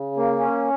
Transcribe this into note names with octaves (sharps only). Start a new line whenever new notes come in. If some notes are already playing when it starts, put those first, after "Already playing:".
Already playing: C#3
A#3
C#4